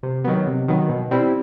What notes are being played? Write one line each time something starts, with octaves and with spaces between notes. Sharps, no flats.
C3
D#3 F#3 B3
C3
D#3 F#3 B3
B2
G3 C4 E4